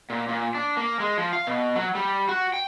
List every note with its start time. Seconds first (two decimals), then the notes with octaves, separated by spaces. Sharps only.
0.10 A#2
0.29 A#2
0.55 D4
0.77 A#3
1.00 G#3
1.18 F3
1.33 F5
1.47 B2
1.76 F#3
1.95 G3
2.29 F#4
2.54 G5